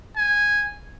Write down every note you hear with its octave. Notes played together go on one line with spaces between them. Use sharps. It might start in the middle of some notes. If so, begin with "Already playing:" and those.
G#5